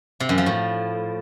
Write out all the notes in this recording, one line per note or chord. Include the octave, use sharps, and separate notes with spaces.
C3
F#2
F3
A2